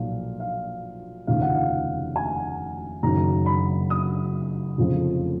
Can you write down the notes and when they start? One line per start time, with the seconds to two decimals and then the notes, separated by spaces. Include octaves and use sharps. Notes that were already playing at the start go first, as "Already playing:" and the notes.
Already playing: B1 A#2 F3 F5
0.40 F5
1.27 F1 D#2 C#3 F3 F5
1.42 F#5
1.55 F5
2.16 G#5
3.03 F#1 F#2 D#3 A#5
3.46 B5
3.90 D#6
4.78 F1 F2 C#3 F3